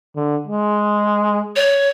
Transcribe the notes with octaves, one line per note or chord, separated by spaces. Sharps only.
D3
G#3
C#5